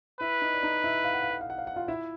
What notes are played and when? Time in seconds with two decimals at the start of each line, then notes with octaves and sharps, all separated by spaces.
0.20 E4 B4 E5
0.42 D#4 D#5
0.54 D5
0.63 D#4 D#5
0.84 E4 E5
1.04 F5
1.13 F#5
1.22 F5
1.31 F#5
1.41 F5
1.50 F#5
1.58 F5
1.67 F#5
1.76 F4 F5
1.88 E4 E5